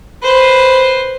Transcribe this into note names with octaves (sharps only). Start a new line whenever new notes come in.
B4 C5